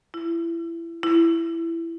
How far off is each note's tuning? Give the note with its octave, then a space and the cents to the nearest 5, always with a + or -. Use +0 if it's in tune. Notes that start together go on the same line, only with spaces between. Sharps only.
E4 +25
E4 +15